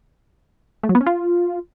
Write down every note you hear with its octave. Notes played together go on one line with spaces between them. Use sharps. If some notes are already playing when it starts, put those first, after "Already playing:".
A3
F#3
B3
C#4
F4